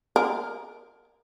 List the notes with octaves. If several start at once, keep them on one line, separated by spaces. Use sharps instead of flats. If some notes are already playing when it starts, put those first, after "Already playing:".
A#4